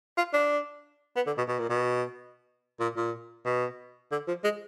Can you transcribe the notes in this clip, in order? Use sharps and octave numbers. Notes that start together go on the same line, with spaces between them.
F4
D4
B3
D3
B2
B2
A#2
B2
A#2
A#2
B2
D3
F3
G#3